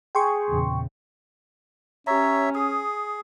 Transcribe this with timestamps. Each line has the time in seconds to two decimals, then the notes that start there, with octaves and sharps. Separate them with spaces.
0.15 G#4 G5 C6 C#6
0.49 E2 A#2 C#3
2.07 C#4 G4 C#5 E5 A#5
2.55 G#4 D#6